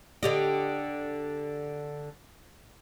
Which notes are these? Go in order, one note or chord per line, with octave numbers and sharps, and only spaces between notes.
D3 G4 D#5